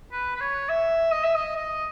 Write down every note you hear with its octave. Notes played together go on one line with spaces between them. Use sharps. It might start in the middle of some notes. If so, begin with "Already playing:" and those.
B4
B4
C#5
E5
D#5
E5
D#5
D#5